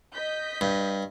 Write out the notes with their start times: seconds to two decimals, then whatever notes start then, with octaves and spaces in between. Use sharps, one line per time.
0.12 D#5 G6 B6
0.61 G2